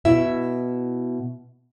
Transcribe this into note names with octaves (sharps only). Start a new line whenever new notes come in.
B2 E4 E5